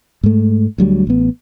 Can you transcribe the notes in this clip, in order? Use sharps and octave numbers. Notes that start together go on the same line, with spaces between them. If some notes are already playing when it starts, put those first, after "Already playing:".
G#2 A3
D2 F#3 G3
A1 B3